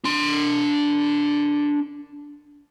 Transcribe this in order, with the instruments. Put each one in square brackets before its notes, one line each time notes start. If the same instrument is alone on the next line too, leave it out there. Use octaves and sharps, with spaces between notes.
[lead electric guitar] D4 C6